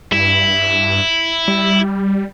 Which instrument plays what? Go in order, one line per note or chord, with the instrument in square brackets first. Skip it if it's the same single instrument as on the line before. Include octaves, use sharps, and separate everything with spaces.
[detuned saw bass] G2 [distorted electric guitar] E4
[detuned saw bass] G3